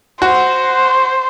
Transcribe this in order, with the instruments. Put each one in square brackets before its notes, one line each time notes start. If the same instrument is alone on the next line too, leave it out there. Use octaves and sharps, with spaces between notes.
[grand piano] F#4 [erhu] C5